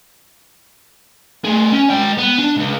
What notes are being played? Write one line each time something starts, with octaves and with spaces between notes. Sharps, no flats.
A3 G#4
C#4
G#3 G5
B3
D4
C#2